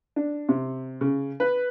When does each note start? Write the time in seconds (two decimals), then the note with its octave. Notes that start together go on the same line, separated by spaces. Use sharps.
0.16 D4
0.49 C3
1.01 C#3
1.40 B4